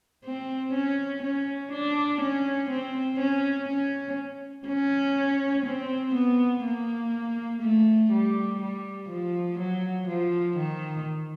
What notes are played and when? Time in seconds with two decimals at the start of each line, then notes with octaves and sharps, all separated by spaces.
0.25 C4
0.74 C#4
1.23 C#4
1.72 D4
2.21 C#4
2.70 C4
3.20 C#4
3.69 C#4
4.67 C#4
5.65 C4
6.15 B3
6.64 A#3
7.62 A3
8.11 G3
8.60 G3
9.10 F3
9.59 F#3
10.08 F3
10.57 D#3